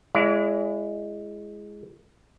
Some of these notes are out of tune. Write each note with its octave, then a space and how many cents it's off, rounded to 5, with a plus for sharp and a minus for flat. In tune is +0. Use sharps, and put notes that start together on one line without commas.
G#3 +0 E4 +25 D5 -40